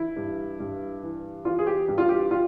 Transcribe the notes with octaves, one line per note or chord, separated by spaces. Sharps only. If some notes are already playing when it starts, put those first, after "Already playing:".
Already playing: E3 E4
G2
G2
E3
E3 F4
G#4
G4
G2
F4
G4
F4